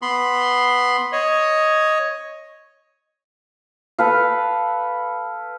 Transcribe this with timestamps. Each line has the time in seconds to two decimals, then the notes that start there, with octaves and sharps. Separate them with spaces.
0.02 B3 B5 C6
1.12 C#5 D#5
3.99 A4 B4 F5